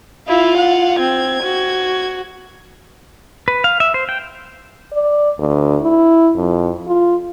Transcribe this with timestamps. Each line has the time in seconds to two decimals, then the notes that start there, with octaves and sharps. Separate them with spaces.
0.28 E4 F4 F5
0.58 F#5
1.00 C4 G#6
1.43 F#4
3.48 B4
3.64 F5
3.80 E5
3.94 C5
4.09 G5
4.93 D5
5.39 D2
5.82 E4
6.36 F2
6.88 F4